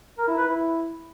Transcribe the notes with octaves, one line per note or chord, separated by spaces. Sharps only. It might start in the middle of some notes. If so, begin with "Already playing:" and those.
A#4
E4
B4
E4